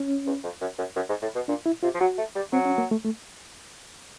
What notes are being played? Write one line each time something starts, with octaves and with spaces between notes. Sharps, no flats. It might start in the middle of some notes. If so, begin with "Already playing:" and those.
Already playing: C#4
E2
F2
F#2
F#2
F#2
G#2
A2
B2
A#2 D4
E4
C3 F4
F3
F#3 F#4
A3
G3
F#3 C4
C#4
A#3
A3
A3